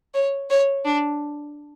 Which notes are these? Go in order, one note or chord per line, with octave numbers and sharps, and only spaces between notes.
C#5
C#5
D4